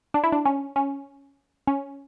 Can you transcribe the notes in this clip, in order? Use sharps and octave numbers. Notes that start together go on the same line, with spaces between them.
D4
E4
D4
C#4
C#4
C#4